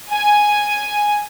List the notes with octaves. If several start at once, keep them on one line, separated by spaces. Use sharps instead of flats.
G#5